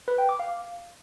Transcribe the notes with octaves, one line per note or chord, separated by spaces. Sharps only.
B4
G5
D6
F5